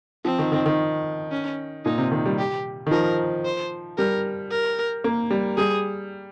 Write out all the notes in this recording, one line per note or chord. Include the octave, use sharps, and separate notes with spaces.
F3 C4
D#3
D#3
D#3
C#4
A#2 D#4
C3
D#3
G3
G4
D#3
F3 A#4
C5
G3 A#4
A#4
A#3
G3
G3 G#4